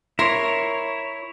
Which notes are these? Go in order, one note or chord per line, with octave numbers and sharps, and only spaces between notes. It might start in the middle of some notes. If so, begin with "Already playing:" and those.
E4 A#4 C#5 C6